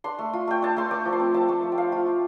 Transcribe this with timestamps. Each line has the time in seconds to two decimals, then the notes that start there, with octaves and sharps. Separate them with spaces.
0.04 D4 C6
0.19 A3
0.33 F4
0.47 A3 G5
0.62 D4 A5
0.77 A3 C6
0.91 A3 D6
1.05 F3
1.13 C6
1.20 C4
1.34 F3 A5
1.49 A3
1.63 F3
1.72 G5
1.77 D4 F5
1.92 A3 F4
2.07 F4